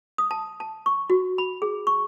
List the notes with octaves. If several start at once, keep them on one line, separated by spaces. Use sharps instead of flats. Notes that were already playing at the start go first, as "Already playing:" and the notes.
D#6
A5
A5
C#6
F#4
B5
G#4
C#6